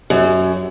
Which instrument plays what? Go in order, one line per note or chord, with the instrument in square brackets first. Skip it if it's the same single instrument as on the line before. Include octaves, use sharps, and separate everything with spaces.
[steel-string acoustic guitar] F#2